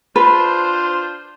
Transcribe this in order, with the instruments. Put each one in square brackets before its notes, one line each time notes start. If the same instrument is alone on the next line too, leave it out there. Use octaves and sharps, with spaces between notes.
[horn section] D4 F4 C5 [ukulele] B4